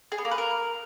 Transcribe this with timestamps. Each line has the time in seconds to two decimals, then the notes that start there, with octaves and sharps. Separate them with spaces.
0.12 G#4
0.18 B3
0.25 A#3
0.31 B4
0.38 A#4